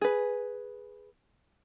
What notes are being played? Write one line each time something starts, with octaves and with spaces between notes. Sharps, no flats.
G#4 B4